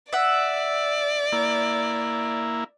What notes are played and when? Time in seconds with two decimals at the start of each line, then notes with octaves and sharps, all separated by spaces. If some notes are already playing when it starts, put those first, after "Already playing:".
0.13 D5 E5 F#5
1.33 A#3 E4